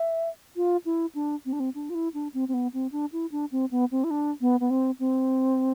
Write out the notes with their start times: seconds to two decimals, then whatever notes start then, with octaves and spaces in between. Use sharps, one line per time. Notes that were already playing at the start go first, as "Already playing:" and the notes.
Already playing: E5
0.56 F4
0.85 E4
1.15 D4
1.45 C4
1.53 D4
1.60 C4
1.75 D4
1.90 F4
1.95 E4
2.14 D4
2.34 C4
2.48 C4
2.54 B3
2.73 C4
2.92 D4
3.12 E4
3.32 D4
3.52 C4
3.71 B3
3.91 C4
4.04 E4
4.11 D4
4.41 B3
4.60 B3
4.70 C4
4.99 C4